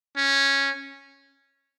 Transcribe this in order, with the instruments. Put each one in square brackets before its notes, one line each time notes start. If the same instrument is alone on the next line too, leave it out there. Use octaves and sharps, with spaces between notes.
[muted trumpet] C#4